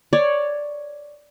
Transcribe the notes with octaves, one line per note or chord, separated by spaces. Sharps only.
C#5 D5